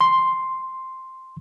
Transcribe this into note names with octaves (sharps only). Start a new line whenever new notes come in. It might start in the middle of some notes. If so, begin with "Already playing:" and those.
C6